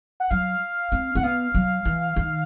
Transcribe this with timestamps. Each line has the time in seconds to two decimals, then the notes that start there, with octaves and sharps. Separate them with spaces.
0.20 F#5
0.31 F#3 F5
0.92 C4
1.15 C4 F#5
1.23 B3 F5
1.54 F#3
1.85 E3
2.16 D#3